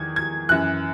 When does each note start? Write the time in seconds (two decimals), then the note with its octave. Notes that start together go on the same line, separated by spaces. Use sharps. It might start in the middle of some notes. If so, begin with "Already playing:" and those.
Already playing: E2 D#3 G#6
0.16 G#6
0.49 F#2 E3 F#6